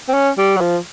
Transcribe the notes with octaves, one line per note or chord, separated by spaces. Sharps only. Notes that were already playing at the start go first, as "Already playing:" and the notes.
C4
C#4
G3
F#3
F3